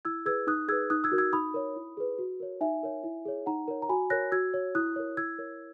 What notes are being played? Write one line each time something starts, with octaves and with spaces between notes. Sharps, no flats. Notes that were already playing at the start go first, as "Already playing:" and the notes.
E4 E6 G#6
G#4 B4 E6 G#6
D#4 D#6 F#6
G#4 B4 E6 G#6
D#4 D#6 F#6
E6 G#6
F#4 A#4
E6 G#6
D#4 B5 D#6
A#4 C#5
E4
G#4 B4
F#4
A#4 C#5
D#4 E5 G#5
A#4 C#5
E4
G#4 C#5
D#4 F#5 A#5
A#4 C#5
A#5
F#4 G#5 B5
A#4 C#5 F#6 A#6
F#4 E6 G#6
C#5
E4 D#6 F#6
A#4 C#5
E4 E6 G#6
A#4 C#5